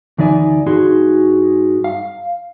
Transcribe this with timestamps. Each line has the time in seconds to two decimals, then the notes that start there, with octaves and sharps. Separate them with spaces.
0.18 D2 E3 D#4 D5 G#5
0.66 G2 D#4 F#4 G#4 C6
1.84 F5